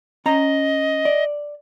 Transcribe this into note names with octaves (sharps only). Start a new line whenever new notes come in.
C#4 D#5 A#5
D5